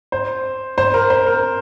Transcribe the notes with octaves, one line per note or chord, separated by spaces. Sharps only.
C5
C5
A#4
C5
A#4